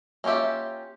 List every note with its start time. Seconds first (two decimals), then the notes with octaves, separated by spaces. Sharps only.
0.24 A#3 C#4 F4 G4 E5